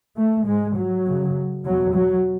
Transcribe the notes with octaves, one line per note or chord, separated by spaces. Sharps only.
A3
G#2 G#3
F#3
F#2 C#3
E2 B2 F#3
F#3